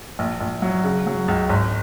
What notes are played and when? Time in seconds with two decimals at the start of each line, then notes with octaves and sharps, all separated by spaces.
0.19 A#1
0.41 A#1
0.62 F#3
0.84 C#3
1.07 F#3
1.28 C#2
1.49 G#1